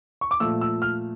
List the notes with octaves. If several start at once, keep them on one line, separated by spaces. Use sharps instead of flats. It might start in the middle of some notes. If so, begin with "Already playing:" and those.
C#6
D6
A#2 F3 A3 E6
E6
F6